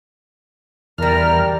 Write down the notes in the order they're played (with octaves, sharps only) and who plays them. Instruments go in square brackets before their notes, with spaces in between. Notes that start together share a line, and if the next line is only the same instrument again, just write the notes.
[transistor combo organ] E2 F6 [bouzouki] G3 D4 [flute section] A#4